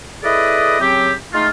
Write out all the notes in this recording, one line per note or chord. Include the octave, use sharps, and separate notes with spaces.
E4 G#4 A4 B4 D5 D#5
C#3 F#3 C4 G4
G#3 A3 D#4 F4